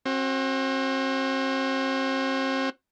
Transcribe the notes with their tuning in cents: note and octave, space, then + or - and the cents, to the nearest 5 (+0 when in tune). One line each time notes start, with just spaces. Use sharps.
C4 +35 F#4 +0